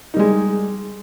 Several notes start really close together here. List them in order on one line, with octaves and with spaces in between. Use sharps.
D#4 G3 G#3